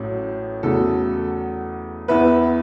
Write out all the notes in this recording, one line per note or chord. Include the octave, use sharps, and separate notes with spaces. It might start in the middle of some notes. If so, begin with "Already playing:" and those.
Already playing: A1 A2 F#3 C#4
E2 C#3 F#3 A3 A4
E2 E3 B3 B4 E5